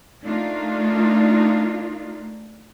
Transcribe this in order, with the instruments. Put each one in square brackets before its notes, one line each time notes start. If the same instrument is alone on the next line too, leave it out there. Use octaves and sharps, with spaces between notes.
[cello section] A3 A#3 D4 D#4 F4